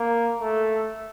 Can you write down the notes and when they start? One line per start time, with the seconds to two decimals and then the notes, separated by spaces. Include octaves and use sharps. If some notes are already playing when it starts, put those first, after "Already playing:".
Already playing: A#3
0.39 A3